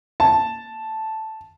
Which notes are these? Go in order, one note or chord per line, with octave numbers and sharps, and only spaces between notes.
A5